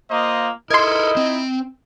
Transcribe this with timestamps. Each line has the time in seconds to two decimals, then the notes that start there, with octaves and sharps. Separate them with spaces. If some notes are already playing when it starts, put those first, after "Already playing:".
0.11 A#3 F4 C5 D#5
0.70 D#4 E4 A4 A#4 D#5 C6 G#6
1.17 C4